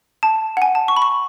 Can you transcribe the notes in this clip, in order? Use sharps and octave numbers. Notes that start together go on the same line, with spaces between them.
A5
F#5
G#5
A5
C#6
B5
C#6